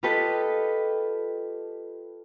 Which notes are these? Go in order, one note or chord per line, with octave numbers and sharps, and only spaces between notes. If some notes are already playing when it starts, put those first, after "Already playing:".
F4 G4 A4 B4 D#5